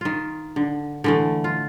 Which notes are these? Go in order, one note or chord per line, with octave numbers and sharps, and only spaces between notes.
D#3 F4
D3
D3 E3 A3
F4